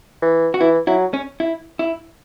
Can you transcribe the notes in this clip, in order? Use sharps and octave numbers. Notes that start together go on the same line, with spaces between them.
E3
F#4
E3 E4
F#3 E4
C#4
E4
E4